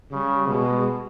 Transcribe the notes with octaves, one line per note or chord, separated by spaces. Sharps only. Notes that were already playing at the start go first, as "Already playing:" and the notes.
C#3 G3
B2 G#3